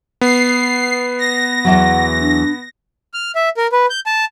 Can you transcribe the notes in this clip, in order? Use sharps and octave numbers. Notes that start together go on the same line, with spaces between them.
B3 C7
A#6
E2 E3 F#3 F#5
D4
F6
E5
A#4
B4
G6
A5